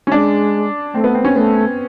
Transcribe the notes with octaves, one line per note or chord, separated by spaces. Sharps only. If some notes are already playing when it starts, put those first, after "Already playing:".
C#4
G#3 D4
A3 C4
B3
C4
C#4
A3 B3